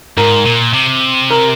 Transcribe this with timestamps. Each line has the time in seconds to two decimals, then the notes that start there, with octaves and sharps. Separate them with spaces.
0.17 G#2 A#4
0.45 A#2
0.73 C3
1.30 A#4